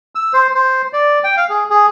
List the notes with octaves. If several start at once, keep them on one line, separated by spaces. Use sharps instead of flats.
E6
C5
C5
D5
G5
F5
G#4
G#4